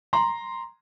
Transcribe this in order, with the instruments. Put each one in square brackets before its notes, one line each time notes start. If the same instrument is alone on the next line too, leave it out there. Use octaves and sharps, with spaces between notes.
[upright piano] A#5 C6